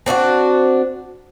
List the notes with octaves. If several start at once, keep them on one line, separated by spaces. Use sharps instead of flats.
C4 D4 D#4 F#4